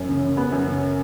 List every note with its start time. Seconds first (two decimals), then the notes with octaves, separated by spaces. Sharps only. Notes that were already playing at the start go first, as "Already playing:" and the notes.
Already playing: F#2
0.09 C#3
0.23 C#3
0.37 B3
0.52 F#2
0.67 C#3